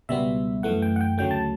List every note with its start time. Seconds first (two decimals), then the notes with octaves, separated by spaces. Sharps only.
0.09 C#2 B2 G3 B3 E5
0.63 F#2 E3 A3 F#5
0.82 G5
0.96 F#5
1.01 G5
1.18 D2 C#3 F#3 A3 G5
1.31 A5